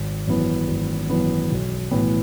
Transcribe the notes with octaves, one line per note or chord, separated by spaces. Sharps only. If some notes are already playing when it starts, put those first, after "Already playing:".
Already playing: G#1
F#2 E3 B3
G#1
F#2 E3 B3
B1
A2 E3 B3